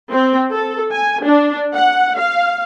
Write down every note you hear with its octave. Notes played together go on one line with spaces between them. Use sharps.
C4
A4
G#5
D4
F#5
F5